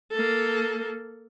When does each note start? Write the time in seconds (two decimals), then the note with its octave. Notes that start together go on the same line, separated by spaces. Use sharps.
0.11 A#3 A4